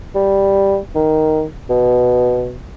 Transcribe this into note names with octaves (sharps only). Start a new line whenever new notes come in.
G3
D#3
B2